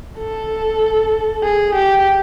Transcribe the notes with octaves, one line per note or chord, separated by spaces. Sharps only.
A4
G#4
G4